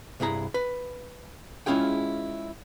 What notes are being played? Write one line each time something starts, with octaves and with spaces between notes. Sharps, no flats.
C2 G2 E4 G#4 A#5
B4
G#3 C#4 E4 F4 G#4 G5